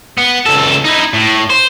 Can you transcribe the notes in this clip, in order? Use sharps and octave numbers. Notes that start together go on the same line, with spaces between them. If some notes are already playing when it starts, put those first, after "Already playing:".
B3
C#2 A4
D#4 E4
A2
C5